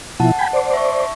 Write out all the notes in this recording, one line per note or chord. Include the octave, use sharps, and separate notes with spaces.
B2 F3 E4 F#5 A5
G5 G#5 B5
C5 D5
E5 A5 C#6